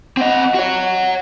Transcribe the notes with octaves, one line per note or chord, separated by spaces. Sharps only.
C4 D#5 F#5
F#4 C#5